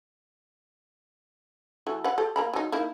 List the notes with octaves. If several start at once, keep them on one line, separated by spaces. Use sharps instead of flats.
E3 A3 F#4
B4 F#5
G4 A4
A#3 A#5 B5
F#3 D#4
A#3 D#4 E4